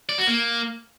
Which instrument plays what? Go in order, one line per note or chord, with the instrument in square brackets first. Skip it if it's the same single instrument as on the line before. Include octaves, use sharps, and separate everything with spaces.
[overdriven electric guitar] D5
F#4
A#3